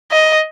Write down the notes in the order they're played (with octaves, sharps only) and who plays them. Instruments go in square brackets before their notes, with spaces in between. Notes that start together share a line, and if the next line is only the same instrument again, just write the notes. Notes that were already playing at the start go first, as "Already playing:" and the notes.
[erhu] D#5